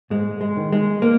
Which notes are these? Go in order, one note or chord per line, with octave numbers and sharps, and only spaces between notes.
G#2 G#3
G#3
D#3
G#3
A#3